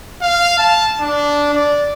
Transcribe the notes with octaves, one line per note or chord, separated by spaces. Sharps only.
F5
A5
D4
D5